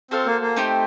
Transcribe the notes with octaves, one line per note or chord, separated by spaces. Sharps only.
C4 F#4 A4 C5 F5
A#3
A#3
A3 C4 D#4 G4 C5